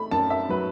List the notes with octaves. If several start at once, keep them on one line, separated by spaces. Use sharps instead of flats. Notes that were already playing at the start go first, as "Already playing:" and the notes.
Already playing: A3 B5
F#2 A5
E5
F#3 B4